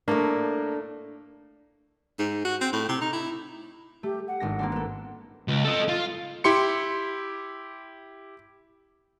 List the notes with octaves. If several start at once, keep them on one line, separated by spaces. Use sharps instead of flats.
A2 A3 A#3 D4
G#2
F#4
C4
A2
C3
D#4
E4
A3 G4
F#5
G#1 D4 A#6
A#3 C4 D4
B3 A4
C#2
A4 D#5
F4
E4 G4 C6 C#7